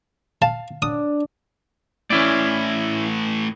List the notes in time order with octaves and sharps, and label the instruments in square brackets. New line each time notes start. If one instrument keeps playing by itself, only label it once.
[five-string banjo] F5 [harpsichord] A5
[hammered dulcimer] D4 [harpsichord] D#6
[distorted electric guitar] A2 E3 [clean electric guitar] C#4 E4 D5